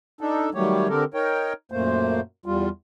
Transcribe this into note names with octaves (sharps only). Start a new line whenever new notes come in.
D4 D#4 A4
D#3 F#3 G3 A3 G4 C#5
D3 C4 G4 A4 A#4
D#4 A#4 C#5 G5
F#2 A#2 A3 A#3 C5
E2 G3 F4